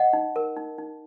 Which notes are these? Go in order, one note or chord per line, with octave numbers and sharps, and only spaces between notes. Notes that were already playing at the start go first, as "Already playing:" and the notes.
Already playing: D#5 F#5
D#4
A#4
D#4
D#4